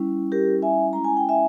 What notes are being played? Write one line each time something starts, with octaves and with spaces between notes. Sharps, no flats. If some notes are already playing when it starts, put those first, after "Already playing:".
Already playing: G3 C#4 E4
G4 A#4
E5 G#5
G#3 C#4 E4 A#5
G#5
G5
E5 G#5